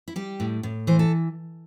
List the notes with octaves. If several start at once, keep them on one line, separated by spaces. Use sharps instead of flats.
E4
G3 G4
A2
A2
E3 C5
A4